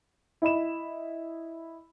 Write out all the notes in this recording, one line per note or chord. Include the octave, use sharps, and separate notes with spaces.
E4 D#5 B5 E7